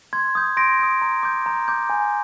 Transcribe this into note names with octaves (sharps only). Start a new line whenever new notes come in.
C6 G#6
D#6 G6
C6 A#6 D7
D#6 G6
A#5
D6 G6
A#5
D6 G6
G#5